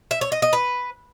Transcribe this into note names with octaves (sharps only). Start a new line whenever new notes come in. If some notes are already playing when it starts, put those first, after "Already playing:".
E5
C#5
D#5
D#5
B4